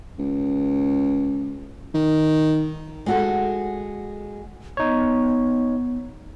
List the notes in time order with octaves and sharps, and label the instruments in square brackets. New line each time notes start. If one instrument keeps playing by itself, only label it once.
[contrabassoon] C#2
D#3
[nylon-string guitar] G#3 F#4 A4
[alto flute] B3 [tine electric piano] D#4 C#5